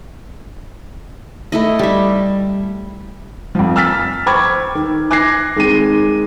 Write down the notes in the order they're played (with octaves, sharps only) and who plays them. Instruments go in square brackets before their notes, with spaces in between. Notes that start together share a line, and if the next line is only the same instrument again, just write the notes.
[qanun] A3 E4 D#5
G3 E5
[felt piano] F2 F3
E6 F6 A6 B6
C5 G5 B5 C#6 D6 G#6
D#3
D6 F#6 G#6 A#6 C7
D#3 G#3 C4 D#7